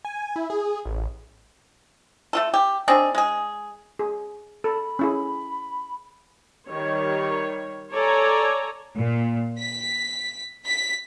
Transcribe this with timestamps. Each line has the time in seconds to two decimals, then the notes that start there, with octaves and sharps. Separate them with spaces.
0.05 G#5
0.36 E4
0.50 G#4
0.85 A1
2.33 A3 F4 A4
2.54 G4
2.88 C4 D4 D#4 G#4
3.15 G#3 G#4
3.99 G#4
4.64 A4 B5
4.99 C#4 E4 G#4
6.68 D#3 G3 C#5
7.93 A4 C#5 D5 G#5 A#5
8.96 A#2
9.58 B6
10.65 B6